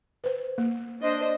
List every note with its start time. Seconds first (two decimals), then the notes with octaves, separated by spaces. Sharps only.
0.24 B4 C5
0.58 A#3
1.02 D4 C5 D#5